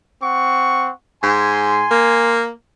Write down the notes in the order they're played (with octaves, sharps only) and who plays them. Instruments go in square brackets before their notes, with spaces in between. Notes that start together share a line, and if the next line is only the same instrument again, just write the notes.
[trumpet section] C4 F#5 C#6
[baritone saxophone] G#2 [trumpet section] G#5 C6
[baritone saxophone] A#3